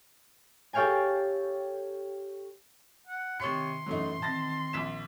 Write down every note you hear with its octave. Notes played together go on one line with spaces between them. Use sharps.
G4 A4 C#5 F5 G5 G#5
F#5
C3 D#3 C#5 C6 C#7
F#2 E3 F#3 A3 D#4
D#3 C4 A5 A6 A#6
A#1 B6 E7